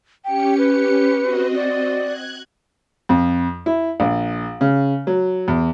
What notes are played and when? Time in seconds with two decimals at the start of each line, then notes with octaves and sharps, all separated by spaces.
0.25 C#4 G4 G5 C#7
0.58 B4
1.19 C4 F#4 D#5
1.55 D5
1.99 F#6 G#6
3.09 F2
3.66 E4
4.00 A#1
4.61 C#3
5.07 F#3
5.48 E2